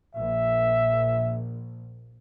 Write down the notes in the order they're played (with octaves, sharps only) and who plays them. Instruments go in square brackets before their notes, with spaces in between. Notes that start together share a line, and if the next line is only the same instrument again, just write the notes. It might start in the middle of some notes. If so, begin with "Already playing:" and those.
[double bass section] A#1 [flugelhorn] E5